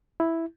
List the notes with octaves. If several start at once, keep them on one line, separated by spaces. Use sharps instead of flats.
E4